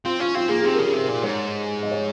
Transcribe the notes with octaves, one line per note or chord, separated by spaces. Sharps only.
C4 F4
C#4 F4
C4 F4
A#3 G#4
G#4
C3 G4
A#4
C#3
G#4
C3
A#4
A#2
G#2 C#5
D#5
C#5